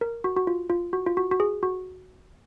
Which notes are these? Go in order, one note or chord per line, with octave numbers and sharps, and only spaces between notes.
A#4
F#4
F#4
F4
F4
F#4
F4
F#4
F#4
G#4
F#4